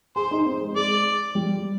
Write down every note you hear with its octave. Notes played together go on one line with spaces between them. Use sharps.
G#4 C5
D#4
C4
G#3
G#3 D5
G3